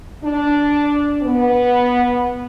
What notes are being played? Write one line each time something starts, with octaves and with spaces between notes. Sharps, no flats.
D4
B3